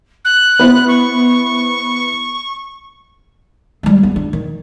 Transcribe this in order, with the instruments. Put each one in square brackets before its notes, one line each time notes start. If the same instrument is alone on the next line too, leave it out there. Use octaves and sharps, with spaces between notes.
[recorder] F#6
[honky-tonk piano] B3 E4 C5
[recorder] C#6
[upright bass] G3 G#3
B3
D4
D#3